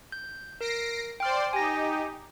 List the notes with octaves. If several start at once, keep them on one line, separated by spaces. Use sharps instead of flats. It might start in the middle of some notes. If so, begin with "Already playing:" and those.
G6
A#4 A#6 C7 D7
C5 D5 G5 C6 F6
D#4 G4 G#5 A#6